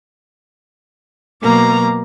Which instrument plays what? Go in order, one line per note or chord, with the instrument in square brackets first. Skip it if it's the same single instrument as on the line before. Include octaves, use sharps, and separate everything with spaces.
[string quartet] B2 F#3 A#3 A#5 D6